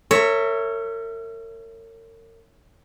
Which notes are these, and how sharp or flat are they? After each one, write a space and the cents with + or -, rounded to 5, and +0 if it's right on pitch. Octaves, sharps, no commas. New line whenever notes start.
A#4 -40 C#5 +0 E5 +0